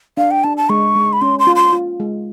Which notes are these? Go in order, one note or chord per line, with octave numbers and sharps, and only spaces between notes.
D4 F5
G5
D4 A5
A5
G#3 C#6
G#3
B5
C#4 C6
C6
F4
C6
F4
G#3